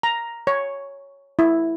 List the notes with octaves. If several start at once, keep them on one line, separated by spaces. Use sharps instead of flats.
A#5
C#5
E4